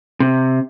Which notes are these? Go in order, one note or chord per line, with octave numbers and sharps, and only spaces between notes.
C3